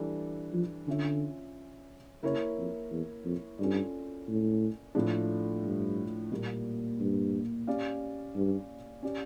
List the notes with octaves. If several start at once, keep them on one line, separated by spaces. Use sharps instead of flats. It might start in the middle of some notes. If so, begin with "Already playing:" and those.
Already playing: E3 G3 D4 A4
F3
D3 C#4 F4 C#5 E5
C#3 A#3 E4 A#4 C#5
F2
E2
F2
G2 C#4 F4 A4 D5
A2
A2 F3 A3 D4
G2
A#2 G3 A#3
G2
C#4 G4 D5 F5
G2
C#4 G4 D5